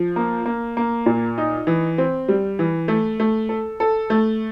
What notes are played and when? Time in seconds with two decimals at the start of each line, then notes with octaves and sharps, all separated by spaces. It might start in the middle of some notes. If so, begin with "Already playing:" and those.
Already playing: F3
0.16 A#3
0.46 A#3
0.77 A#3
1.06 A#2
1.38 D#4
1.67 E3
1.98 C4
2.28 G3
2.59 E3
2.88 A3
3.20 A3
3.49 A4
3.80 A4
4.10 A3